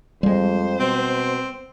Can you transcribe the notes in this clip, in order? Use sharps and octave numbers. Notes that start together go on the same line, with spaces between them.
F2 G3 G#3 C5
B2 C4